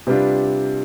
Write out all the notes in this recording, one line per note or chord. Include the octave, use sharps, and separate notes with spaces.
C3 G3 D4 F4 B4